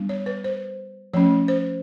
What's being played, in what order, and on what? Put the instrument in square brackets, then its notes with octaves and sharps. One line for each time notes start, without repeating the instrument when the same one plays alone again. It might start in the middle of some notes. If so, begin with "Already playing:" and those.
Already playing: [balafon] G3 B3 D4
C#5
B4
C5
F3 A3 C#4 C#5
C5